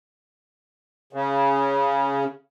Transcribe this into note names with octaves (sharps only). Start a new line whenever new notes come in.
C#3